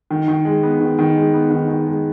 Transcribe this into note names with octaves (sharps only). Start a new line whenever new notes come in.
D#3
D#3
G#3
B3
D#3
D#3
G#3
B3
D#3
D#3
G#3